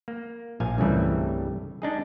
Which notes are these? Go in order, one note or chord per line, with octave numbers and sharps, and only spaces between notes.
A#3
A#1 A#2 F5 G#5
C2 G2 C#3 E3 G3 A3
G#3 D4 D#4 G#4